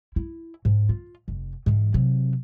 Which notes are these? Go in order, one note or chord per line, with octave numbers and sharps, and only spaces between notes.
E4
G#2
F4
F1
G#2 E3
C3 F#3